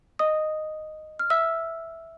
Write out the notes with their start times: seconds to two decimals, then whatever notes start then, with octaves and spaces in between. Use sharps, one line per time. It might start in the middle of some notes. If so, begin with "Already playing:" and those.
0.19 D#5 D#6
1.19 F6
1.30 E5 E6